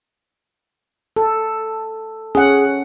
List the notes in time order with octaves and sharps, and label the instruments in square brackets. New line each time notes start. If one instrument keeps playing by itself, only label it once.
[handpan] A4
[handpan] C#4 F#5 [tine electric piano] G#4